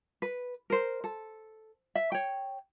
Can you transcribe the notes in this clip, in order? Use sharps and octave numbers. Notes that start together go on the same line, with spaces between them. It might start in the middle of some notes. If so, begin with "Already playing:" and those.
B4
A#4 C5
A4
E5
C#5 G5